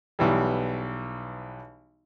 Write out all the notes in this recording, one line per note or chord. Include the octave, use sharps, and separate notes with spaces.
B1 E3 G3